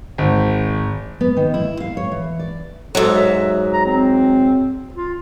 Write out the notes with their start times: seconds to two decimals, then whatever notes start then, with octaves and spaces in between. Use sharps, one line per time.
0.18 G#1
1.21 B3
1.37 D#3
1.54 E4
1.80 F5
1.97 C#5
2.12 E3
2.39 D5
2.95 G#2 F#3 A4
3.15 E5
3.73 A#5
3.86 C4
4.94 F4